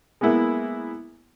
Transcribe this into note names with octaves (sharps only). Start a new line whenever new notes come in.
G#3 A#3 B3 E4